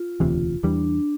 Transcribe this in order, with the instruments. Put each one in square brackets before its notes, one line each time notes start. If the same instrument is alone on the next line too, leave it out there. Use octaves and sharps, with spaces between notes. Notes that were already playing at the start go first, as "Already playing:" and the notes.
Already playing: [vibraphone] F4
[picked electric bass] E1 D2 C3 E3
[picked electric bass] E2 E3 G3 [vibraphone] D4